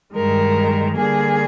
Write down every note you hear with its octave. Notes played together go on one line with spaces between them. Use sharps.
G2 D#3 G#3 A#4
D3 G3 A#3 G#4